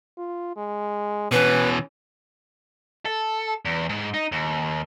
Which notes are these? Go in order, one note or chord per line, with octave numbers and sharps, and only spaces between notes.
F4
G#3
B2 E3 C#4 B4
A4
E2
G#2
D#4
D#2